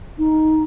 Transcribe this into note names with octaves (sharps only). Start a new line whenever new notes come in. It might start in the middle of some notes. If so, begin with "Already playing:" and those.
D#4